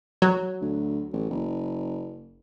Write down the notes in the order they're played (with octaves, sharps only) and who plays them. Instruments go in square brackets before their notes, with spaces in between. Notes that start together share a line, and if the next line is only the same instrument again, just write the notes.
[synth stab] F#3
[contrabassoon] D2
A1
F#1